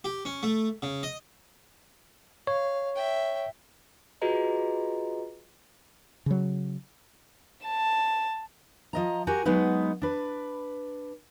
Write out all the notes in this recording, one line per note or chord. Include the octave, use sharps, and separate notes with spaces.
G4
C#4
A3
C#3
D#5
C#5 F5
E5 G5
F4 F#4 G#4 B4 D#5 A#5
C#3 F#3
A5
F3 D#5 A#5
F#4 G4 A#4 G#5
F#3 G#3 B3 D#4 B4
D4 B4